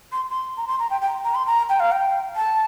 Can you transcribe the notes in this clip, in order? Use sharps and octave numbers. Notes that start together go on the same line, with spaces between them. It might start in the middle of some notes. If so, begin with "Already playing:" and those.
C6
C6
A#5
C6
A#5
G5
G5
A#5
C6
A#5
G5
F5
G5
A5